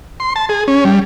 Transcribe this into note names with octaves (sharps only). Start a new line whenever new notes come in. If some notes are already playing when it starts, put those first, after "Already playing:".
C6
A5
G#4
C#4
G3